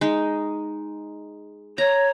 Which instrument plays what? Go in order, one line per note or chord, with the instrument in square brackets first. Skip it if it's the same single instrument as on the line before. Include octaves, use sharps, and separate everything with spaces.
[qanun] G#3 D#4
[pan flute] C#5 [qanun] A#5